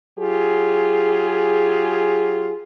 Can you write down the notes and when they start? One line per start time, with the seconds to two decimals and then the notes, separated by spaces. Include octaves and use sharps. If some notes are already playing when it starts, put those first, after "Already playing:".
0.19 F#3 F4 G4 G#4